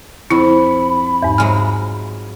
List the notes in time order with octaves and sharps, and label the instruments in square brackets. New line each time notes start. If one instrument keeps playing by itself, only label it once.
[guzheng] F2 [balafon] E4 [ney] B5
[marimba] E2 G#2
[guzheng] F#3 G#3 F4 [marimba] G#5 F6